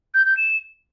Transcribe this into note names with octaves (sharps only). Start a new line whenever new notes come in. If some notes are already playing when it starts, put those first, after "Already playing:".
G6
G6
E7